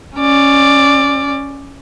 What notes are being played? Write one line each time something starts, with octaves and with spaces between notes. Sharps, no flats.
C#4 D5